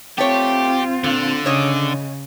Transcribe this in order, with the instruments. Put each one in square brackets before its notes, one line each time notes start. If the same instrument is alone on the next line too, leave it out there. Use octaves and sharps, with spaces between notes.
[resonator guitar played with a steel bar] A3 C#5 [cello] C4 F4 [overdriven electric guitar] G4
[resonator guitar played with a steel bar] A#2 [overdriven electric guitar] D3
[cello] C#3 [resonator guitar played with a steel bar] C#5 D#5